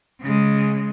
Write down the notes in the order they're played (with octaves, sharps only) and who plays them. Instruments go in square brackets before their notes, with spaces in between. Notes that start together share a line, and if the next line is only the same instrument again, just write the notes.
[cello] C#3 G#3